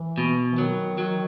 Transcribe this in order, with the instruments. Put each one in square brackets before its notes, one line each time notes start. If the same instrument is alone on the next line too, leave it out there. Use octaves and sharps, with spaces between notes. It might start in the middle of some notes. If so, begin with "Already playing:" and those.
Already playing: [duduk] E3
[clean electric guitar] B2
[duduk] E3
[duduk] D#3 [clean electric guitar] F#3
[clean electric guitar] F#3